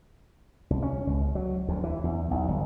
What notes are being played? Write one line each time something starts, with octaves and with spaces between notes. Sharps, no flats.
C2
C#4
C#2
F#3
D2
E3
E2
B1
G1